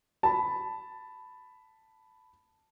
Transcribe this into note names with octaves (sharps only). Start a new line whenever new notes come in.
A5 B5